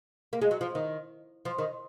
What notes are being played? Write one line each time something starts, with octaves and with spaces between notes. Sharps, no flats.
A#3
G#3
F#3
F3
D#3
F3
D#3